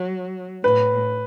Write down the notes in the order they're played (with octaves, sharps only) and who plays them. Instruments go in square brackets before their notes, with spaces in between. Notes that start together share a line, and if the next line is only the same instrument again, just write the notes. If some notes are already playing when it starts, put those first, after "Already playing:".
Already playing: [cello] F#3
[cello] A2 [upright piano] B4